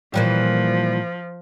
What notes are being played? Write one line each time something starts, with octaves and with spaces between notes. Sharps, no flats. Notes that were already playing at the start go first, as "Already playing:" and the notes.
A#2 E3 F3 G3